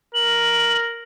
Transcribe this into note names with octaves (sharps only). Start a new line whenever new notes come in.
A#4 F#7